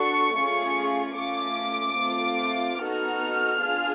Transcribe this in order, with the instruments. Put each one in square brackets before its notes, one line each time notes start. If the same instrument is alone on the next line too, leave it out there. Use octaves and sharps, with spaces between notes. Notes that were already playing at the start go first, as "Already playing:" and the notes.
Already playing: [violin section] D4 F#4 A4 C#6
A3 C#4 F4 G#4
A3 C#4 F4 D6
A3 C4 F4
B3 D#4 F#4 A4 F6
D4 F4 G#4